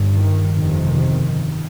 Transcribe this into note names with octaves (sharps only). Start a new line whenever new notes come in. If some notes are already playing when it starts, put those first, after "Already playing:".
Already playing: G1 G2
D#3
G1 F2 C3 D#3